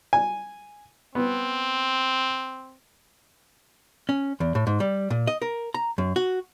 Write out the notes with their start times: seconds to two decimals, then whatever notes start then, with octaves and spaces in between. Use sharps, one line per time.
0.13 G#5
1.15 B3 C4
4.09 C#4
4.40 E2
4.55 A2
4.67 G#2
4.80 G3
5.10 A#2
5.27 D#5
5.42 A#4
5.74 A#5
5.98 F#2
6.16 F#4